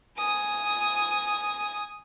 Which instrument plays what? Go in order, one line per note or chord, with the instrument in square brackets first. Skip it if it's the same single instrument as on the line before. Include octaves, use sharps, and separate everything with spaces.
[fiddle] G#5 D#6